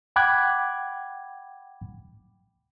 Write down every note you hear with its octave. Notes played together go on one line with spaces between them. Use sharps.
F#5 G5 B5 D6 F#6 G#6